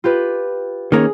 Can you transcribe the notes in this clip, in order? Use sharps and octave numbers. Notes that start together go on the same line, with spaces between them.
F4 G4 B4
D#3 A#3 C#4 G#4